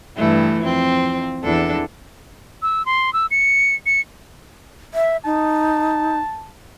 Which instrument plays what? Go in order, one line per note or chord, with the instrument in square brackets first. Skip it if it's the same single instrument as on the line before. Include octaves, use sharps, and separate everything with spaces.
[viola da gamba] G2 E3 A3
F2 C4
E2 D4 A4
[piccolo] E6
C6
E6
C#7
C#7
[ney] E5
[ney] D#4 [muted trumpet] A5